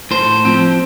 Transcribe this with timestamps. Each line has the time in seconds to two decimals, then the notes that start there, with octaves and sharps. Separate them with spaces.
0.11 A2 C5
0.45 F3 C4